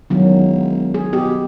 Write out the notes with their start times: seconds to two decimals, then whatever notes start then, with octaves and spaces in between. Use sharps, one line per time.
0.10 E1 D#3 F#3
0.94 G#4
1.13 B2 G4